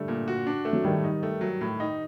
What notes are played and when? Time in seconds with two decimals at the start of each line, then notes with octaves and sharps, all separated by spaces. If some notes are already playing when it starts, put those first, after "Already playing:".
Already playing: D3 G3 A3
0.08 A#2
0.28 F#4
0.47 D4
0.65 A3
0.73 F#3
0.84 A2 D#3 G3
1.04 D#4
1.23 A3
1.41 F#3
1.61 A2
1.80 D#4